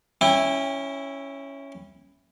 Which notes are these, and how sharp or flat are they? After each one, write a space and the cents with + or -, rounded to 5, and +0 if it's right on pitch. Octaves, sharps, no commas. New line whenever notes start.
C#4 +0 E4 +0 G5 +40